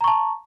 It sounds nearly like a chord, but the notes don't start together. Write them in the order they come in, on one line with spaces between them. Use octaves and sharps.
A#5 C#6 A5